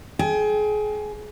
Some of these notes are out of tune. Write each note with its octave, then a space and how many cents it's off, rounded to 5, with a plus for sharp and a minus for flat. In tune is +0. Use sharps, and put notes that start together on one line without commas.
G#4 +30 G5 +15